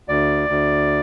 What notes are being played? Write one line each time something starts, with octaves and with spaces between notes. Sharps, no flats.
D2 D5
D2